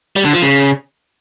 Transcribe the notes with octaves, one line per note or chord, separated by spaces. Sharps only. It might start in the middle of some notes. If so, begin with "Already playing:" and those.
G3
D3
F3
C#3